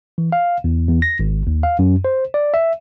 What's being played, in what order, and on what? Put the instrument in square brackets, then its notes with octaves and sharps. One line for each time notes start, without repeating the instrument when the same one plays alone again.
[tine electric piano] E3
F5
E2
E2
A#6
G#1
D#2
F5
F#2
C5
D5
E5